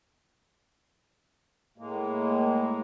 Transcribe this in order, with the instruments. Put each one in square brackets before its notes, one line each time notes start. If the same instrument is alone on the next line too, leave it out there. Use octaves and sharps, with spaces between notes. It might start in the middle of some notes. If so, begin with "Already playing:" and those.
[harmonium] A2 G#3 A#3